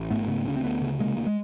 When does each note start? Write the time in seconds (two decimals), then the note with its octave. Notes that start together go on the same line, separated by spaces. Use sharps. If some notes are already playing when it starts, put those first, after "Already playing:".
Already playing: A1
0.10 G#2 A3 B3
0.21 A#3
0.28 C#3 A3 B3
0.46 D2 C#4
0.56 C4
0.64 D2 A3 B3
0.82 C#3
1.00 C3 G#3 A#3
1.17 D2
1.27 G#3